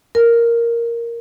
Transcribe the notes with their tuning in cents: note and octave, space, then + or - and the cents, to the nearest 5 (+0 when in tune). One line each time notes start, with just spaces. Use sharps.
A#4 +0